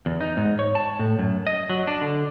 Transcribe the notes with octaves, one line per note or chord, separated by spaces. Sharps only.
E2
D#4
G#2
C#5
A5
A2
F#2
D#5
F#3
D4
D3